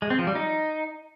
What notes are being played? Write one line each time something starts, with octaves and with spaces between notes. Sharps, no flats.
G#3
C4
F3
G3
D#4